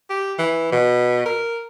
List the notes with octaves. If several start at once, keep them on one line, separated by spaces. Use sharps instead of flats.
G4
E3
B2
A#4